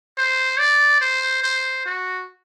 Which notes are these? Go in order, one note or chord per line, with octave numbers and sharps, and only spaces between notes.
C5
D5
C5
C5
F#4